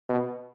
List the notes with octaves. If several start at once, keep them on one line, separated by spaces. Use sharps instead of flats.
B2